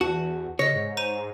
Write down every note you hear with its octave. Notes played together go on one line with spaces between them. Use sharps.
E2 F#4 A5
C#3 C#5 D#5 A#6
G#2
C5 A#5 D#7